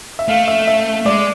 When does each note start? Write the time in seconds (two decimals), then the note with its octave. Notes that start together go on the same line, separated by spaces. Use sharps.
0.19 E5
0.28 A3 F5
0.48 E5
0.67 E5
1.06 G#3 D5